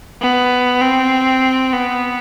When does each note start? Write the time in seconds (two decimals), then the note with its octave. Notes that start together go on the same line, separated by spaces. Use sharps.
0.21 B3
0.82 C4
1.73 B3